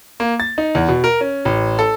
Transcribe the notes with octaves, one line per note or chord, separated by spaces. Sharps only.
A#3
A6
D#4
E2
B2
A#4
C#4
A1
A4